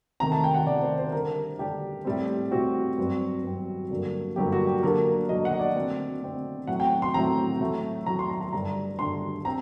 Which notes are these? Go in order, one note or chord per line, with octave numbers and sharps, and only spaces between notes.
C3 D#3 A3 A#5
A5
G5
F#5
C3 D#3 A3 D5
C5
C5
D3 G3 D4 A#4
D3 G3 D4 G4
A2 G3 C4
A2 G3 C4 F#4
G2 F#3 C4
G2 F#3 C4
G2 D3 F#3 A#3
G2 D3 F#3 A#3 G4
F#4
G4
D3 F#3 A#3 D4 A#4
D3 F#3 A#3 D4 D#5
F#5
D#5
D5
D3 A3 C4
D3 A3 C4
A2 F#3 C4 F#5
G5
C6
A2 F#3 C4 A#5
A2 F#3 A3
A2 F#3 A3 A#5
C6
A#5
A#5
G2 D3 G3 D4 A#5
G2 D3 G3 D4 C6
C4 A#5